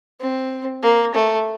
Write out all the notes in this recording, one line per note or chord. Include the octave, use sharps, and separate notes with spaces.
C4
A#3
A3